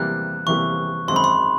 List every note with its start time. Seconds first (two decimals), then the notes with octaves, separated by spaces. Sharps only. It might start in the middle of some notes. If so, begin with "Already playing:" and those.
Already playing: E2 C3 E3 G3 A#3 F#6
0.47 E2 C3 E3 G3 A#3 C#6
1.08 G#1 F#2 D#3 G#3 C4 C6
1.16 B5
1.24 C6